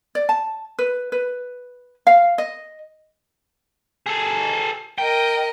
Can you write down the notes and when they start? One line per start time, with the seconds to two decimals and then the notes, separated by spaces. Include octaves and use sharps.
0.15 D5
0.29 A5
0.79 B4
1.12 B4
2.07 F5
2.38 D#5
4.06 G#4 A4
4.98 A#4 D#5 G5